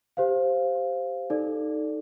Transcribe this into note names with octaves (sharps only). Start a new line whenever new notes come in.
G4 C5 F5
D#4 A4 D5